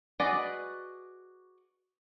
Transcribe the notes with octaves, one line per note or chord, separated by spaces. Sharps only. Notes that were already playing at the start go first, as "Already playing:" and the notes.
F#4 G#4 B4 D5 D#5